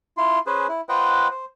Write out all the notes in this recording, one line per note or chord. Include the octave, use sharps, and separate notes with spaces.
E4 F4 C6
C#4 G#4 B4 C5
E4
F4 B4 C5 D#5 F#5 G5
C5